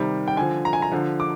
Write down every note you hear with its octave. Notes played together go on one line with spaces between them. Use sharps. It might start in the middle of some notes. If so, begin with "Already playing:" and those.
Already playing: C3 D#3 G3
G5
D3 F3 G#5
A#5
G#5
A#5
D3 F3
D6